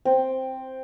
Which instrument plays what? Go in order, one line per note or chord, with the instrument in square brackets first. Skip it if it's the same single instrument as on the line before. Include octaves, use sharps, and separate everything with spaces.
[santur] C4